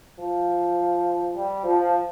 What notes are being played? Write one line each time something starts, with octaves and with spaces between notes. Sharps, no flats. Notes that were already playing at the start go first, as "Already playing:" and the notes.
F3
G3
F3